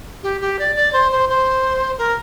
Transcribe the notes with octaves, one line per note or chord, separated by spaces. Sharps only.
G4
G4
D5
D5
C5
C5
C5
A#4